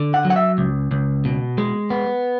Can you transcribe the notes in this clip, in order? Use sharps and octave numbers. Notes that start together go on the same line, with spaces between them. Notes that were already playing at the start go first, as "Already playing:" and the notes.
Already playing: D3
F#5
F#3
F#5
E5
C#2
C#2
B2
G#3
B3